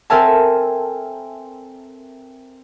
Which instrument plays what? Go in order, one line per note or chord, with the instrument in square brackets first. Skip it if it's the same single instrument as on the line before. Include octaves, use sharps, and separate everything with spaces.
[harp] C4 A4 A#4 E5 G#5 A5